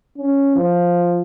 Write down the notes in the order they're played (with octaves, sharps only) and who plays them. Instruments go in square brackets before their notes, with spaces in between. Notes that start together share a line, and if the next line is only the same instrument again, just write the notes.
[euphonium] C#4
F3